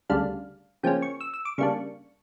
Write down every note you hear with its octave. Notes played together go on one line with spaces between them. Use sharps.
D2 C#3 G3 D4 F5
C#3 F3 A#3 C#4 G5
C#6
E6
E6
D6
C#3 G3 A#3 D4 C#6